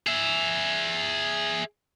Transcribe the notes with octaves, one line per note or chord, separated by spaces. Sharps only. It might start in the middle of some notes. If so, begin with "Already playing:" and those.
G#4 E5